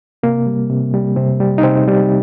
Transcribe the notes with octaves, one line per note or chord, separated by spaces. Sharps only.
C3 A#3
G3
C3
G3
C3 C4
G3
D#4
C3 C4
G3